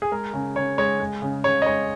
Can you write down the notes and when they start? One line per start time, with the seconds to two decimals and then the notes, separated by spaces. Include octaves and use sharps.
0.02 G#4
0.12 G#3 A#4
0.33 C#3
0.56 C#3 C#5
0.78 G#3 C#5
1.00 G#3
1.22 C#3
1.44 C#3 C#5
1.62 D#5
1.66 G#3 C#5